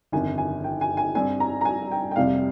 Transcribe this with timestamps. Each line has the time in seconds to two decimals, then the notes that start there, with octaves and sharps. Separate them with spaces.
0.12 G1 F2 D#3 G#5
0.38 G#5
0.64 G5
0.81 G#5
0.97 G#5
1.15 G2 G3 C4 G#5
1.40 A#5
1.61 A#5
1.65 G#5
1.91 G5
2.11 G5
2.16 F1 F2 C3 G3 F5